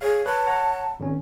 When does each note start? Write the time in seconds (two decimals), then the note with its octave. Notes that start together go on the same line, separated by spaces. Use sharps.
0.01 G#4 C#5 F5
0.26 B4 C#5 A5 F#6
0.46 C#5 F#5 A#5
1.00 G#1 C#4